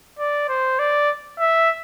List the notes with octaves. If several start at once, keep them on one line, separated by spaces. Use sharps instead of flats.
D5
C5
D5
E5